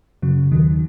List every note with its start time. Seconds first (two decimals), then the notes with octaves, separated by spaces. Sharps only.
0.22 F#2 C#3 F#3
0.52 D#2 D#3 F#3